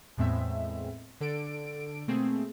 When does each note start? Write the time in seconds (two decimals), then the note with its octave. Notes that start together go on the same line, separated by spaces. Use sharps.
0.17 E2 A2 G#3 B3 C4 E5
1.20 D3 A4 D5 D7
2.08 B2 A3 A#3 C4 G#4